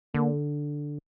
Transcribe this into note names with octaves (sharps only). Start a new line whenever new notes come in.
D3 A#3